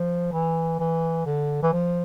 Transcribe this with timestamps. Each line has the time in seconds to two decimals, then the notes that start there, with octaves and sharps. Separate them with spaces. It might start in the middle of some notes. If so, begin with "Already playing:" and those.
Already playing: F3
0.32 E3
0.79 E3
1.26 D3
1.62 E3
1.72 F3